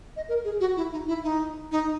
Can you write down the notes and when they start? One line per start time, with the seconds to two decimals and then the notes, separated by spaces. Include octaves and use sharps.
0.16 D#5
0.29 A#4
0.45 G#4
0.60 F#4
0.77 E4
0.92 D#4
1.08 E4
1.23 D#4
1.72 D#4